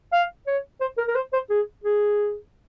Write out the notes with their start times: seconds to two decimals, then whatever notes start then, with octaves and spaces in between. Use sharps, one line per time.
0.13 F5
0.47 C#5
0.81 C5
0.98 A#4
1.08 A#4
1.16 C5
1.33 C5
1.50 G#4
1.84 G#4